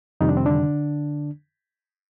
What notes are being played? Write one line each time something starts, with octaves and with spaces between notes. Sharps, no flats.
F2 C3 D#3 G3 D#4
D4
C4
D3 D4